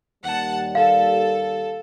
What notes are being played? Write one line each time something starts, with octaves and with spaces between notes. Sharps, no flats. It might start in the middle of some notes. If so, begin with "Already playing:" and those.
D#2 G3 F#5 A5
A4 F5